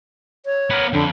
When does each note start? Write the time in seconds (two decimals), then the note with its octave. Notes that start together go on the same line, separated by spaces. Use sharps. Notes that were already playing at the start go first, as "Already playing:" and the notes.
0.45 C#5
0.70 B3 A#4
0.93 F2 D3